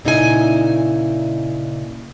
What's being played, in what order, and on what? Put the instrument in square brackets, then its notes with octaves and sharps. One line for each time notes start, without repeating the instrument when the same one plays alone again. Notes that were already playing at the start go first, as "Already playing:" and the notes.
[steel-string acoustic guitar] A#2 C#3 D#4 E4 G#4 G#5